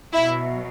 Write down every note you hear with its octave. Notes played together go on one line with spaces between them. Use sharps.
B2 F#3 E4 E5